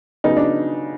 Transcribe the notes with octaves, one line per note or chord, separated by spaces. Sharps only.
C#3 F#3 B3 D#4
D4